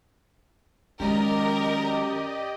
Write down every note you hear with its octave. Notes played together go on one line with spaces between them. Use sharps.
F#2 D#3 G#3 G4 A#4 D5 D#5